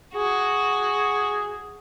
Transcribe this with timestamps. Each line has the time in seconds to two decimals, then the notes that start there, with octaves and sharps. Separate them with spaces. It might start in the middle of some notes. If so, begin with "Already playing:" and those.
0.15 F#4 G#4